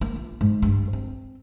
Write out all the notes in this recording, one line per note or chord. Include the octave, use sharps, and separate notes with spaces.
A#3
F4
G#2
G2
C4